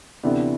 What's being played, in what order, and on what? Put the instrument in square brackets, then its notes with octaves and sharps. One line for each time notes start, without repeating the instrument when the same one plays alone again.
[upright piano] D2 C3 E3 B3 D4